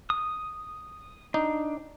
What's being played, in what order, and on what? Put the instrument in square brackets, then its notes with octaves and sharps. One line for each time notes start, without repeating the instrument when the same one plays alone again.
[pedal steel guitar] D#6
[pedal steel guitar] D4 [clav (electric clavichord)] D#4